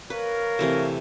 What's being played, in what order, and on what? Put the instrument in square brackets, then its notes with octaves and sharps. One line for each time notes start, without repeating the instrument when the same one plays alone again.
[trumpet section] A#4 C#5 F5 [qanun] B4
[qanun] C3 E3 A3